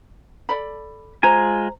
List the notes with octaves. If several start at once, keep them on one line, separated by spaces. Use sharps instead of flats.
A4 D5 B5
G#3 F4 C5 G#5 A#5